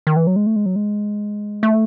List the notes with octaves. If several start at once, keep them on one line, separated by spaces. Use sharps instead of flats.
D#3
E3
F#3
G#3
A3
G#3
F#3
G#3
A3